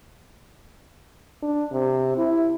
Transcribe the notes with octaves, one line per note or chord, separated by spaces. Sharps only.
D4
C3
E4